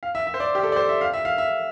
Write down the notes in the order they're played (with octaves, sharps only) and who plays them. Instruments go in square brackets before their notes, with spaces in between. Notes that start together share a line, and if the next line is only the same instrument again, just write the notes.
[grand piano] F5
E5
E5
C5
D5
G4
A4
D5
C5
E5
F5
E5
F5
E5